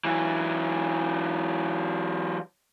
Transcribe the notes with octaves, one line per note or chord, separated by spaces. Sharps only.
E3 F#3